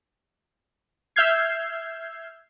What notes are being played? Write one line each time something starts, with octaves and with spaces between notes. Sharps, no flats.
E5 E6 F6 G6 G#6 C7